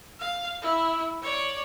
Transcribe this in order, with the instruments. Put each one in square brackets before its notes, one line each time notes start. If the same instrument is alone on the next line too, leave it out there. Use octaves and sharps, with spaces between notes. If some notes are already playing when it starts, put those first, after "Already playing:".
[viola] F5
E4
C#5 D5